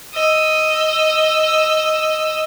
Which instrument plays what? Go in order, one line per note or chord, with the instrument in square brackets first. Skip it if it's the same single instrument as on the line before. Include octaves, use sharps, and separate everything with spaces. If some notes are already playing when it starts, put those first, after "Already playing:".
[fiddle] D#5 E6